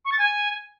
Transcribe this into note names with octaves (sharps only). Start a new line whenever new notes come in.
C#6
A6
G#5